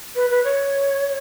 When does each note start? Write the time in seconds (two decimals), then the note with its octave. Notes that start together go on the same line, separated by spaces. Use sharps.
0.15 B4
0.30 B4
0.44 C#5